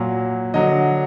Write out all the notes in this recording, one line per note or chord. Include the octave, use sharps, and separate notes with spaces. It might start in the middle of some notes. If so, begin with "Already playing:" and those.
Already playing: A#2 F#3
D3 F#3 D#5